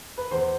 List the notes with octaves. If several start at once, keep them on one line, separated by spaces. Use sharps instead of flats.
B4
E2 C5